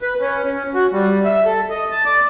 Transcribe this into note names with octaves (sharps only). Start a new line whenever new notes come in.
B4
C#4
C#4
F#4
G3
E5
A4
D#5
A5
D5